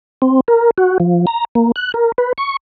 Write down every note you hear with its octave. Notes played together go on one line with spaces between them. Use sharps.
C4
A#4
F#4
F3
A#5
A#3
F#6
A#4
B4
C#6